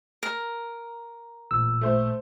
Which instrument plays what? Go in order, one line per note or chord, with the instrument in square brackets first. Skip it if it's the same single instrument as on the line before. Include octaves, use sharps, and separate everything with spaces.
[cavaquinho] A#4
[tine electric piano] A1 A#2 E6
[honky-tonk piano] A3 C5